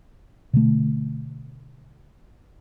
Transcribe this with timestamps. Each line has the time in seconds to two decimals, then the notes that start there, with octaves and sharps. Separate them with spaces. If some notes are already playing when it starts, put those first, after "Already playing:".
0.53 B2 D3 A3